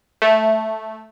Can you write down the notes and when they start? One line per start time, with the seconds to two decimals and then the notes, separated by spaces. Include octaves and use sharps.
0.22 A3